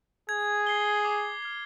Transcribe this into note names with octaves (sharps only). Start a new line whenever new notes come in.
G#4 G#6
C7 G7
D6
F6 G#6